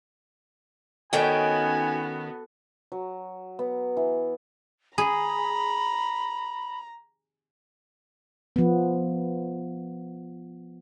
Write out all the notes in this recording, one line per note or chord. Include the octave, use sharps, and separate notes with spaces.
D#3 B3 C#4 F#4 A4 G5 G#5
F#3
B3
E3
G#4 A#5 B5
F3 B3